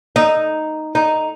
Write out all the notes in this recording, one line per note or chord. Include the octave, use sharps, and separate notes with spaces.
D#4
D#4